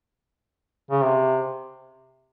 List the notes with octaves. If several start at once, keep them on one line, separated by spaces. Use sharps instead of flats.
C#3
C3